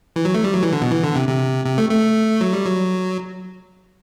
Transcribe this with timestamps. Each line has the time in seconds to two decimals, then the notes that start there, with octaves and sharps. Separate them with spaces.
0.16 E3
0.25 F#3
0.34 A3
0.44 G3
0.54 F#3
0.63 E3
0.72 D3
0.81 B2
0.91 E3
1.04 D3
1.15 C3
1.29 C3
1.66 C3
1.78 A3
1.90 A3
2.41 F#3
2.53 G3
2.65 F#3